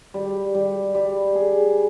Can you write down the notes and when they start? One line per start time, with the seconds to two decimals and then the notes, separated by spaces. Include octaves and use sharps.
0.14 G3
0.54 G3
0.95 G3
1.35 G#4